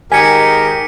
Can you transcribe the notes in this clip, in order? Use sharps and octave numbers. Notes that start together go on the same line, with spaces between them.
G#2 D#3 G4 A#4 G#5 B6 C#7 D#7